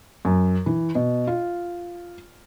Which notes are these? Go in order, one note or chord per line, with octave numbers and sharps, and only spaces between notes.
F#2
E3
B2
F4